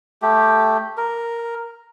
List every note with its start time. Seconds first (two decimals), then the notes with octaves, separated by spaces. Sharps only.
0.22 A3 G4
0.97 A#4